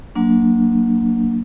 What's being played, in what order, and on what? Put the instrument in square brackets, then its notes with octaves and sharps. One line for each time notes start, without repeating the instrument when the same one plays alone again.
[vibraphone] F#3 A#3 D4